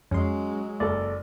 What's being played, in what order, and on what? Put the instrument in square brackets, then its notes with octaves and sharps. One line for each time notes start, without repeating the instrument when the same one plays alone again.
[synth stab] F2 C6 [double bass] F#3 G#3 [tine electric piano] C#4
[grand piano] F#1 A4 [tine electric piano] D5